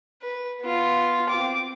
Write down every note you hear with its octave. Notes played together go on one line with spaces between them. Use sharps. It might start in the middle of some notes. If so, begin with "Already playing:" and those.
B4
B3 F4
C4 D6